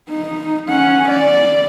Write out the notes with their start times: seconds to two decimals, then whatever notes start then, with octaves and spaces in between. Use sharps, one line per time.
0.10 D#4
0.68 C#4 F#5
1.09 D5